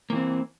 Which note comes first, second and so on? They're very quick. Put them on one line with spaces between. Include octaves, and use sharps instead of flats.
A#3 E3 C4